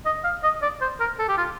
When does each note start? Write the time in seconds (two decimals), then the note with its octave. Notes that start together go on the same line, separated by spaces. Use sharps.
0.05 D#5
0.24 F5
0.43 D#5
0.62 D5
0.81 C5
1.00 A#4
1.19 A4
1.28 G4
1.38 F4